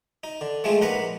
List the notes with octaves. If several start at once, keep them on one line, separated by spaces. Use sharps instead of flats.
D#4
D3
F3 G#3 A3 C4 G#4
A#1 D#4 B4 F#5 A#5 B5